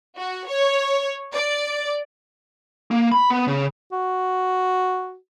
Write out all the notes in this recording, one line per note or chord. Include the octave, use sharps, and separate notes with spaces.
F#4
C#5
D5
A#3
B5
B3
C#3
F#4